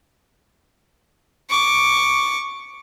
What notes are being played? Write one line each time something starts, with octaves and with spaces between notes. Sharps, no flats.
C#6 D6